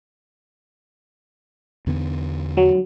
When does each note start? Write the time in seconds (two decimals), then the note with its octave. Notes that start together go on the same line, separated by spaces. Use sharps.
1.87 E2 D3 B3
2.57 F#3